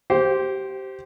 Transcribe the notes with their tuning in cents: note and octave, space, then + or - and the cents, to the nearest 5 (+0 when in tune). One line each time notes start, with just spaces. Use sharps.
G4 -20 C5 +0